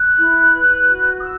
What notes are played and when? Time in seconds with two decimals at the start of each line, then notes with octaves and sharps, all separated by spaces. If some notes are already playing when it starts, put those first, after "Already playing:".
Already playing: F#6
0.17 E4
0.53 B4
0.88 F#4
1.18 D#6
1.23 E6